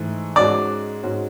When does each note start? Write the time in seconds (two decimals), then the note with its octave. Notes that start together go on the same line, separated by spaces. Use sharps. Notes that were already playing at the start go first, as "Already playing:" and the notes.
Already playing: G#2 E3 A3
0.36 G#2 G#3 C#4 F#4 D5
1.03 G#2 G#3 C#4 F#4